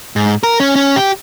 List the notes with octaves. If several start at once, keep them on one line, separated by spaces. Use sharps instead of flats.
G#2
A#4
C#4
C#4
G4